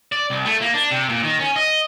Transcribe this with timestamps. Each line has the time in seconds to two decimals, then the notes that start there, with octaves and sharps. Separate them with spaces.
0.12 D5
0.30 C2
0.45 A3
0.61 A#3
0.74 D4
0.91 C3
1.09 A#2
1.23 D#3
1.39 C#4
1.56 D#5